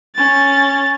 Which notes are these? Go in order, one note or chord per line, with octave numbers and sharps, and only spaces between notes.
C#4 A6